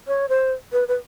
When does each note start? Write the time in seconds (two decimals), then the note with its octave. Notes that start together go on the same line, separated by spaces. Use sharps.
0.07 C#5
0.29 C5
0.72 B4
0.88 B4